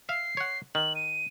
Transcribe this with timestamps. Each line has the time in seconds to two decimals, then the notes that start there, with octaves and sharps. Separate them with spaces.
0.09 E5 F5 C7
0.37 C#5 F#5
0.75 D#3 F#7
0.95 D#7